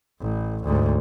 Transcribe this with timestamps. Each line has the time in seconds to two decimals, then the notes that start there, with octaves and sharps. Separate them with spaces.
0.21 A1
0.65 D2 G#2